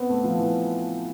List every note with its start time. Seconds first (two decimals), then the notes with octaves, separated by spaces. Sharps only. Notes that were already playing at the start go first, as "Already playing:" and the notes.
Already playing: B3 C4
0.10 A3
0.24 F3
0.38 E3